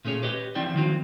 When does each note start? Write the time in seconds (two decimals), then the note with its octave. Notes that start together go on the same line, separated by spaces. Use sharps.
0.05 A#2 A3 C#4 G#4 C#5
0.23 G4 B4 C#5 D#5
0.55 E3 F3 C4 E4 D5 G5
0.74 D#3 F3 F#3 C4